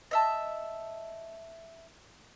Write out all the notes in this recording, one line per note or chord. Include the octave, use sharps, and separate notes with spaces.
D#5 E5 A5